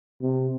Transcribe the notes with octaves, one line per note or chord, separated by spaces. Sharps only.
C3